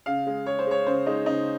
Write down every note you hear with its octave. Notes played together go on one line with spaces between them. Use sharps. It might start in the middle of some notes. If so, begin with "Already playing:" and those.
C#3 F5
G#3
G#3 C#5
C5
G#3 C#5
C#3 C5
G#3 D#4
C#3 D#4